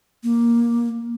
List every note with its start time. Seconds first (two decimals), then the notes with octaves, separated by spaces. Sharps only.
0.23 A#3